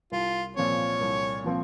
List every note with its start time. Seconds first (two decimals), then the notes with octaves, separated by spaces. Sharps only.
0.12 C2 F4
0.56 A#2 F3 C4 C#5
1.01 C2
1.44 A#2 F3 C4